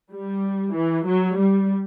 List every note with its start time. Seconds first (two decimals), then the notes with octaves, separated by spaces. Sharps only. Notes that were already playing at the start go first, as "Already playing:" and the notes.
0.12 G3
0.74 E3
1.06 F#3
1.37 G3